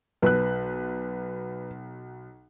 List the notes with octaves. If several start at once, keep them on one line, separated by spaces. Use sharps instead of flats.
B1 B4 F#6